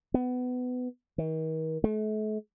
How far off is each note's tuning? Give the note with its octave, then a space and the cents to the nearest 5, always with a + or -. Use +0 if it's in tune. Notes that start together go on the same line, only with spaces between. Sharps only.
B3 +20
D#3 +40
A3 -40